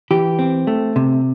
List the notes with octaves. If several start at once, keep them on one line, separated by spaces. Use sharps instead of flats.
E3 G4
C4
A3
C3